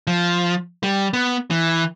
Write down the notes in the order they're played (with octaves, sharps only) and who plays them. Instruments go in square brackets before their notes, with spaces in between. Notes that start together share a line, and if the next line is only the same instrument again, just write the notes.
[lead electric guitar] F3
G3
B3
E3